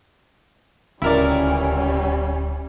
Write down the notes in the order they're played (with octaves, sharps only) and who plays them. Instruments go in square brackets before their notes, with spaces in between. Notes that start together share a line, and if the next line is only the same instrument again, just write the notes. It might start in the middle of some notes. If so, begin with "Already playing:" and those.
[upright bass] D1 [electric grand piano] C#2 [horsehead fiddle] G3 C#4 [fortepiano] E4 A#4 D5